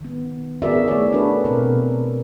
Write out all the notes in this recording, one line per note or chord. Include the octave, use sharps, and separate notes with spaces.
D#3 B3
B3 F#4 G#4 A#4 D5 E5
A3 E4 G4 G#4 C#5 D5
D4 F#4 G#4 A4 B4
B2 C4 A#4